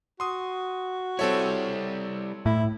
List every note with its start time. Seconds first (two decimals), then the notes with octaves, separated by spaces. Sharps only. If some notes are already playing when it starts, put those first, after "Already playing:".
0.20 F#4 C6 D#6
1.19 G3 C4 E4 A4 C#5
2.46 A2 E4